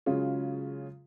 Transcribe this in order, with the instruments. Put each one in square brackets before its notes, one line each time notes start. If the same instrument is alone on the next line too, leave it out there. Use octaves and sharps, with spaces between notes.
[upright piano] C#3 F#3 G#3 C#4 F4